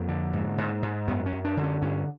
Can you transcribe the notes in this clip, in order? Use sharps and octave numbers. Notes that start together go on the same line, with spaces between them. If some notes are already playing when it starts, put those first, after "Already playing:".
Already playing: F2 A#3
D3
G#2
G#2
G#2
F#2 B3
C#4
F#2
D4
D3
C#4
G2 C#4